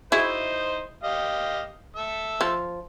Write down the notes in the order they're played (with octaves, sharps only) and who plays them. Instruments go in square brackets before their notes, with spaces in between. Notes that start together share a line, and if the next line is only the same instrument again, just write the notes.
[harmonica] D#4 C5 [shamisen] E4 F#4 G#4
[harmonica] G4 D#5 F5
A4 E5
[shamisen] F3